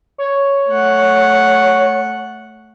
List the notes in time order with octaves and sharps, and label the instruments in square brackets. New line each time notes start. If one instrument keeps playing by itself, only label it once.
[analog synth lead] C#5
[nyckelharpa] A3 F#5